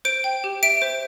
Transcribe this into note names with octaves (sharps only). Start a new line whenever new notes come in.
C5 D7
G5
G4
E5 D7
C5